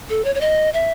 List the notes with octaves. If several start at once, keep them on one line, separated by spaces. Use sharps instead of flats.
A4
C#5
C#5
D#5
E5